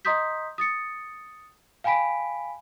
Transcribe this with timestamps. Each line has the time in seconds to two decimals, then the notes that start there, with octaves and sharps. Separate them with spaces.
0.05 D#5 A#5 C6 D#6 G6 B6
0.58 D#6 A6 C#7
1.84 F5 G5 G#5 B5 B6 D7